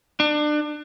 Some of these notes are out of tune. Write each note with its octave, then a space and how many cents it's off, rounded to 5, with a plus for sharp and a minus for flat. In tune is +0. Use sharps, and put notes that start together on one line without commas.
D4 +30